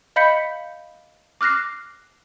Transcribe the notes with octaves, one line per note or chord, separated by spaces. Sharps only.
D#5 F5 B5 G6 B6 C#7
D6 F6 F#6 A#6 C7